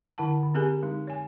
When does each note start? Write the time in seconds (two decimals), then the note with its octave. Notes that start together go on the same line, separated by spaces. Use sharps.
0.18 D3 E4 F#5 A5
0.43 D3
0.54 C4 G4 G#4 A#4 G#5
0.83 G#3 D#4
1.07 C#5 G#5